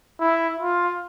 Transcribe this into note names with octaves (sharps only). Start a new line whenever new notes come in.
E4
F4